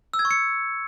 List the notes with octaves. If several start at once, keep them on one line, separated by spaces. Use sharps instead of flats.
E6
G#6
C#6
C#7